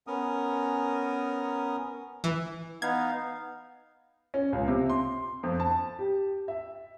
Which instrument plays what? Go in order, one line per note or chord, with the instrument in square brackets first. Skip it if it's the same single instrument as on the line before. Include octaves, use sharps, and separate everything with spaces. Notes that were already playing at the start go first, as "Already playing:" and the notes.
[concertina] B3 C#4 A#4 D#6
[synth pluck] E3
[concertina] B3 D#4 F5 [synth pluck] G#6
[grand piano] C#4
C#2
C3
C6
F2
A5
G4
E5